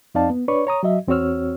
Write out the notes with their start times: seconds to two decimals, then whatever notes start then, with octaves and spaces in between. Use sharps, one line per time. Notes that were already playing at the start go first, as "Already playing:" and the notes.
0.15 F2 C4 D#4 D5 F5 A5
0.30 B3
0.48 D4 B4 C#5 D5 C#6
0.67 C#5 A#5 D#6
0.83 F#3 F#4 D#5 E5
1.08 E2 C4 F#4 C#5 E6 F6